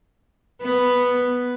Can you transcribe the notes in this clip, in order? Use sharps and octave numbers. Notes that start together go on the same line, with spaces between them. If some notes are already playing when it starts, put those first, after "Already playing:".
B3